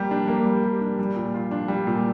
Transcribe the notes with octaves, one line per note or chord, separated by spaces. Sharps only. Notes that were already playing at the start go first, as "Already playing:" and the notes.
Already playing: G3 A#3 G4
D4
A#3
G3
G4
D4
G3
A#2
F4
D4
G3
A#2